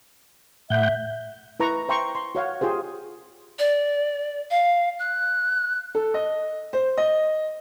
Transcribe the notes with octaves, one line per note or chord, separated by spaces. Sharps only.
A2 E5 F#5 G6
E4 B4 A#5 C#6
C5 E5 G5 A#5 C6 C#6
C6
F#4 C#5 F5 F#5
F4 G4 G#4 C5
D5
F5
F#6
A4
D#5
C5
D#5